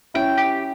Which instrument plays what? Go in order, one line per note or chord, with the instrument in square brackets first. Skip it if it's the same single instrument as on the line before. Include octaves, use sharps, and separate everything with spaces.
[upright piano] C#4 E4 [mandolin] G5
[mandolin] G4